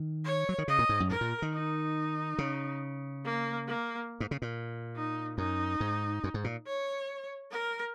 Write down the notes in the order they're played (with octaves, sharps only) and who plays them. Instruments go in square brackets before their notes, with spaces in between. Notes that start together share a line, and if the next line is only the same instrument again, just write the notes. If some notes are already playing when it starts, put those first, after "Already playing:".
Already playing: [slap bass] D#3
[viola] C#5
[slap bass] F#3
D#3
[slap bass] C#3 [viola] D#5
[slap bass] A#2
G#2
F#2
[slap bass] G#2 [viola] A#4
[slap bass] A#2
D#3
[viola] D#4
[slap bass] C#3
[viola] A#3
A#3
[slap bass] G#2
C#3
A#2
[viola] D#4
[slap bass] F#2 [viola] D#4
[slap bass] G#2
F#2
G#2
A#2
[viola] C#5
A#4